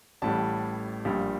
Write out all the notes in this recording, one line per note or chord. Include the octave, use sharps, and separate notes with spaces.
A1 A2 G3 A5
A#1 A#2 G3